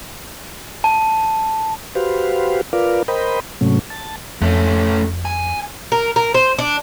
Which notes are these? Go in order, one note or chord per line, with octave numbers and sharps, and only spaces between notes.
A5
F#4 G4 B4 C5 F5
F4 A#4 B4 D5 F5
A#4 C5 D#5 G5 B5
G#2 C3 F#3 A3 C#4
A5
F2 A3 C#4
G#5
A#4
A#4
C5
D4